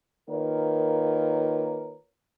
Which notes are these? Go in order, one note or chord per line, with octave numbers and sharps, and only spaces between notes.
D#3 A#3 F4 A#4 B4 C#5